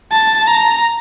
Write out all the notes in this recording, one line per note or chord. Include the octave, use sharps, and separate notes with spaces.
A5
A#5